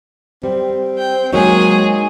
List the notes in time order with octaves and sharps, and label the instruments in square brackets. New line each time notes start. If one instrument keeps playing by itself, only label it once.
[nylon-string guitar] G3 [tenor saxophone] C4
[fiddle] G5
[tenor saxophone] F#3 [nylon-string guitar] G#3 A#3 D#4 [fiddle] G#4